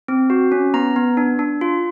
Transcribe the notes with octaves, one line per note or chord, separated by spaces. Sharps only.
C4
F#4
C#4
B3 A#5
B3
D4
D4
F4